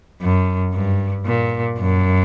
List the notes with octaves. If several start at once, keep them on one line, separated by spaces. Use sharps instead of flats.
F#2
G2
A#2
F#2